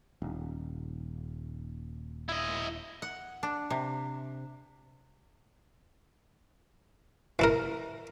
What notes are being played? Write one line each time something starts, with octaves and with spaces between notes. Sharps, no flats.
D#1
E4 D#5
F#5
D4
C3
E3 E4 A#4